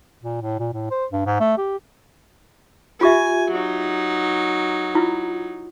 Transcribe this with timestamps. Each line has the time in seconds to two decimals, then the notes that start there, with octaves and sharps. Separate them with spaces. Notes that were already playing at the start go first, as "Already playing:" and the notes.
0.23 A#2
0.42 A2
0.59 A#2
0.73 A2
0.91 C5
1.12 G2
1.26 G#2
1.40 A3
1.58 G4
3.01 F4 G4 E5 G#5
3.51 F#3 D#4
4.95 E4 F4